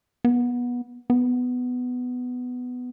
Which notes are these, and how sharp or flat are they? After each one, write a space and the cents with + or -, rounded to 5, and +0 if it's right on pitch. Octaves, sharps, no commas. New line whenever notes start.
B3 -20
B3 +10